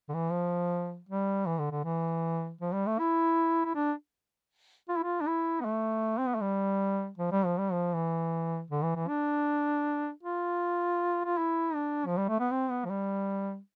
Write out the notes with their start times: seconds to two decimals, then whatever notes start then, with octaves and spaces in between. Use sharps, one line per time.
0.09 D3
0.14 E3
0.32 F3
1.09 G3
1.47 E3
1.59 D3
1.72 D3
1.84 E3
2.61 F3
2.73 G3
2.87 A3
2.99 E4
3.65 E4
3.75 D4
4.89 F4
4.97 E4
5.04 F4
5.21 D4
5.27 E4
5.61 B3
5.65 A3
6.19 C4
6.28 B3
6.35 A3
6.41 G3
7.18 F3
7.32 G3
7.46 F3
7.58 G3
7.73 F3
7.94 E3
8.71 D3
8.83 E3
8.96 E3
9.08 D4
10.23 F4
11.25 F4
11.38 E4
11.75 D4
12.06 F3
12.18 G3
12.29 A3
12.40 B3
12.52 C4
12.70 B3
12.85 F3
12.90 G3